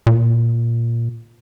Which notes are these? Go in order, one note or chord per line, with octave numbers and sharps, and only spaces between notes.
A#2